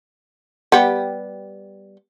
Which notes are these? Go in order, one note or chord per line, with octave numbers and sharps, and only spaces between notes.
G3 B3 G4